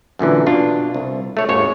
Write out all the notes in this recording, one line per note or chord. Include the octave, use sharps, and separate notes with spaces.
F#2 A#2 D3 E3
B2 D4 F4
C2
A3 C#5
G#1 D#2 C#5